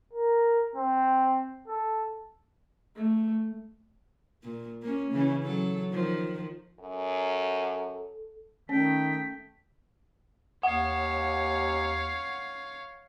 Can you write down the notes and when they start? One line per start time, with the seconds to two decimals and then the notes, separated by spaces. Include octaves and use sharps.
0.13 A#4
0.76 C4
1.68 A4
2.95 A3
4.43 A#2
4.82 A#3 C#4
5.12 C#3 E3 C#4
5.44 F#3 A4
5.91 D#3 F3
6.80 F#2 A4
8.69 D#3 A3 C#4 G5 B6
10.63 D#2 C#5 F5 F#5